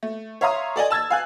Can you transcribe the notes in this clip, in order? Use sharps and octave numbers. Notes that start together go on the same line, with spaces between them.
A3
C#5 E5 F5 A#5 C6 D#6
A4 D5 D#5 G#5
A5 E6 G#6 A6
F5 G#5 F#6